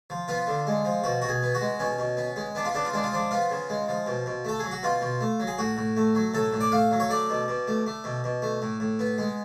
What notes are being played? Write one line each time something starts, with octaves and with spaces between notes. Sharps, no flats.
F3
B3 F4
D3
G#3
F3
B2 F#4
B2 F#4
G#4
B3
F#4
G#3
B2 C#4
B2
B3
G#3
B3 D4
F4
C#3 D4
F4
G#3 D4
F4
F3 D4
B3 F4
C#3
G#3
F3
B2
B2
A3 A4
F#3 G#4
F#4
B2 F4
B2
A3
F#3
G#4
A2 F#4
A2
A3
F#3
A2 A4
A2
D5
A3 F5
F#3
C#5
A3 D5
B2
B2
A3
A3
B2
B2
A3
A2
A2
B3
G#3